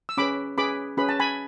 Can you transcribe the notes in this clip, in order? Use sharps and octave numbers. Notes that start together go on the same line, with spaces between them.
E6
C#4 G#4 B4 B5 D6
C#4 G#4 B4 B5 D6
C#4 G#4 B4 B5
A5
G#5 B5